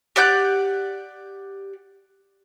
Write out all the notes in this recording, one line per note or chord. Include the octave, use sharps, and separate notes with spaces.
G4 D5 F#5 G6